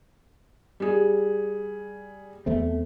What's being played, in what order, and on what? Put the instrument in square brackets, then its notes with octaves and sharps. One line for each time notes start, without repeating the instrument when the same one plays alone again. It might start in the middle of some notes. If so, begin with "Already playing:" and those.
[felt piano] G3 G#4
[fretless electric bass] E2 A3 C4